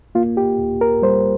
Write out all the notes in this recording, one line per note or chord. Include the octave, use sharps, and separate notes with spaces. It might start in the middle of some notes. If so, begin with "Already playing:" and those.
A#3 F4
G4
D2
A#4
G3 C5